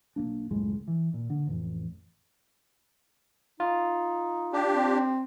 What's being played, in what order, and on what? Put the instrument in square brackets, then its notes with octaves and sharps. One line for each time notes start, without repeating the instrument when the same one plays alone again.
[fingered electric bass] B1 G#2 A#3 D4
C#2 F#2 A2 G#3
E3
A#2
D3
A1 F2
[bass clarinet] D#4 [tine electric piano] F4
[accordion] D4 G4
[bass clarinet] C4